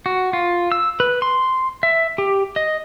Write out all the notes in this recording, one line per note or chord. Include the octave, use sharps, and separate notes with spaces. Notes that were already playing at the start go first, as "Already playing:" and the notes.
F#4
F4
E6
B4
C6
E5
G4
D#5